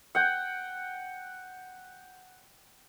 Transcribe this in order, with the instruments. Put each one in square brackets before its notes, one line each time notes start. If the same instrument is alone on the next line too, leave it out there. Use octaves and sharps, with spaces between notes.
[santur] F#5 G5